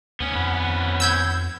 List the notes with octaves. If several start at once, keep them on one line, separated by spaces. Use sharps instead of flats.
D2 B3 C#4
F2 F#5 B5
E6 G6 G#6